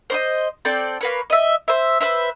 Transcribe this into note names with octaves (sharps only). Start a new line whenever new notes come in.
C5 D5 D#5
C4 A4 D5 G5
A#3 B4 C#5
D#5 E5
C5 E5
B4 C5 E5